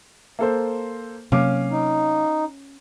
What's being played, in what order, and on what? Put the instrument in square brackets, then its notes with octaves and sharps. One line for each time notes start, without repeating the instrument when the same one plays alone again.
[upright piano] A#3 A4 C5
[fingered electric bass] C3 F#3 A#3 [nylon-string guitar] C#4 [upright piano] F5 D6 F6
[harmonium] D#4